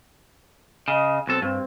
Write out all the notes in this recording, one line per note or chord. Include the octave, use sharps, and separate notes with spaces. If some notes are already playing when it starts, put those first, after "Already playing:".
C#3 D#5
B1 C4 A4
G2 C4